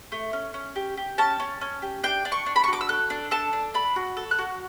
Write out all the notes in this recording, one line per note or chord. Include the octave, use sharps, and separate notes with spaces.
A3
C#4
C#4
G4
G4
C#4 A5
C#4
C#4
G4
D4 G5
D4
C#6
D4
B5
C#6
F#4 D6
E6
A4 F#6
D4
A4 A5
D4
D4 B5
F#4
A4
F#6
F#4